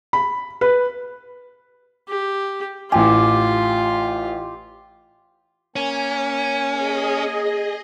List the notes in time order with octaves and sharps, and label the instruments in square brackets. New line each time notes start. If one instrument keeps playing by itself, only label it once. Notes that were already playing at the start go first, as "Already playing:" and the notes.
[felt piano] B5
B4
[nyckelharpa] G4
[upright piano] A1 G#5 [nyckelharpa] F4 [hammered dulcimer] G4
[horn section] A#3 G#5 [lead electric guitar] C#4
[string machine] G#4 D#5